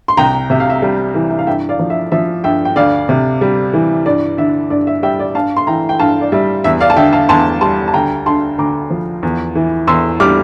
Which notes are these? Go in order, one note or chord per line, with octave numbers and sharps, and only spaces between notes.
C6
C2 G5 A#5
C3 E5
F5
E5
G3
E3
E5
F5
G2 E5 G5
D5 F5
F3
E5
F3 E5
G2 E5 G5
G5
D2 D5 F5
C3
G3
E3
G2 D5
D3 E5
G2 D5
E5
G3 E5 G5
D5
G2 F5 A5
C6
E3 G5 A#5
G5
G2 F5 A5
D5
G3 E5
E2 E5
D5 F5
A5
D3 E5 G5
F5 A5
E2 A5 C6
G3 A5 C6
A5
D2 G5 A#5
D3 A5 C6
D2 A#5 D6
F3
E2
E3
E2 C6 E6
G3 D6 F6